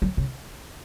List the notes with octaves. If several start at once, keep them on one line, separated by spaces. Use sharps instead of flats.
F#3
C#3